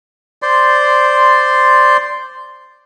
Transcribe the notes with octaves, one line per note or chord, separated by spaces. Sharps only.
C5 D5 C6